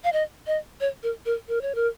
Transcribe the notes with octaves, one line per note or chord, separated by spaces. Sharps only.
F5
D#5
D#5
C#5
A#4
A#4
A#4
C#5
A#4